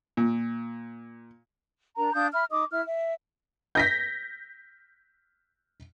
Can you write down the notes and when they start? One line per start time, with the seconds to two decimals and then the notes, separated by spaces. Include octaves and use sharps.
0.17 A#2
1.97 D4 A#4 A#5
2.14 D4 F5 D#6 G6
2.33 E5 B5 F6
2.51 D#4 D#5 D6 D#6
2.71 E4 E5 F6
2.86 E5
3.75 G6 A#6 B6